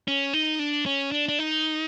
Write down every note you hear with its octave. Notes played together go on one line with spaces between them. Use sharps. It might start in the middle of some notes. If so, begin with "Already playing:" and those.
C#4
D#4
D4
C#4
D4
D4
D#4